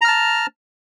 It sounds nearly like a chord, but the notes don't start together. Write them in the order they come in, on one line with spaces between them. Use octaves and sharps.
A#5 F6 A5